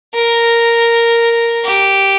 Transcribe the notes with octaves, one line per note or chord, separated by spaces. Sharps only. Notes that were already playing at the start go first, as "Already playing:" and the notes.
A#4
G4